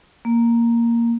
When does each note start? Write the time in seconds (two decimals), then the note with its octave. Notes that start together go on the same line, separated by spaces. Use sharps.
0.25 A#3